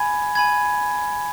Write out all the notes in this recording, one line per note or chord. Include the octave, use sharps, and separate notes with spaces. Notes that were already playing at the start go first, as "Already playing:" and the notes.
Already playing: G#5 B5 G#6
G#5 B5 G#6